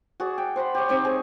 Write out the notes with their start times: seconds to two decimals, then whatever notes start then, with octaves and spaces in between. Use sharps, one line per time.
0.20 F#4 G#4 D5
0.38 G5
0.56 C5 F#5 B5 C6
0.75 G4 C#5
0.89 C4 D#4 G4 C#5
1.05 G#4 G#5 C#6